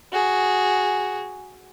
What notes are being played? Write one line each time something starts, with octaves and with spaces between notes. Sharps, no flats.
F#4 G#4